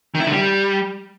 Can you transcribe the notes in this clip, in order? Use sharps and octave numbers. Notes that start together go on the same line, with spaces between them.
D#3
E4
D3
G3